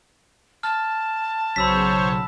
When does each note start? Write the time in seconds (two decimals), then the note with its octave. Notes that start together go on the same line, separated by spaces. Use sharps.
0.63 A5 F6
1.56 B1 C#3 F#3 C5 C#5 B5 E6 B6